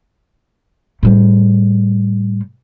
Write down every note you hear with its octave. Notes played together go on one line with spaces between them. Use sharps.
A2 G3